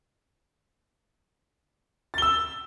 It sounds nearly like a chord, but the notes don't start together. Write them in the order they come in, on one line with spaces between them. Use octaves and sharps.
A6 G7 E6